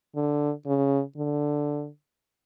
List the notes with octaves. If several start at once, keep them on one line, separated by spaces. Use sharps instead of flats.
D3
C#3
D3